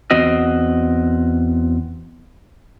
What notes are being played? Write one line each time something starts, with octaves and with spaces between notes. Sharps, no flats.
E2 C4 F#4 D#5